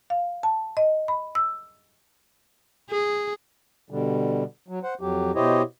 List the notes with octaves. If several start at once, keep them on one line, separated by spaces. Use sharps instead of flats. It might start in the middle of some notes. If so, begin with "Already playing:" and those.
F5
A5
D#5
B5
E6
G#4
B2 D3 G3
F#3
C5 F#5
F2 F#3 G4
B2 E4 G4 C5 C#5 D#5